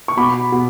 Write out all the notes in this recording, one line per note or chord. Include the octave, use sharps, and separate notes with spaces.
C#6
B2 B5 D6
B2